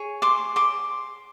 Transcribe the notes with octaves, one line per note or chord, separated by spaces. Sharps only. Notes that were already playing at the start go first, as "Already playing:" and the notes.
Already playing: G#4 C#5
C6 D6
C6 D6